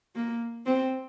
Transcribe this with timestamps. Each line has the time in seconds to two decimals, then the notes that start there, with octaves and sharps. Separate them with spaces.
0.16 A#3
0.66 C4